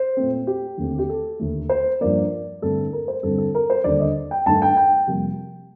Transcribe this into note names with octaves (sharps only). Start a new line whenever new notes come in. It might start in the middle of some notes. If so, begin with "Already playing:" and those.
Already playing: C5
A#2 A3 C4
G4
D#2 D3 A3 C4
G4
A4
D#2 D3 A3
C5
G2 F3 A#3 D5
G2 D3 A3 C4 A4
A#4
C5
G2 D3 G3 C4 A4
A4
A#4
C5
D#2 D3 G3 D4 D5
D#5
G5
G2 D#3 A3 A5
G5
G5
F2 C3 G3 A#3